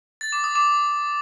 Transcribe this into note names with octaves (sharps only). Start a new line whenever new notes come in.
A6
D6
D#6
D6